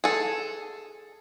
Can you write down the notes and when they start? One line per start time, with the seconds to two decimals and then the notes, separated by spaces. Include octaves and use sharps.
0.04 G#4 A4